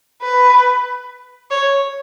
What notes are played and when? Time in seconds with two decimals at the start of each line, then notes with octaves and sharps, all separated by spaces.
0.22 B4
1.51 C#5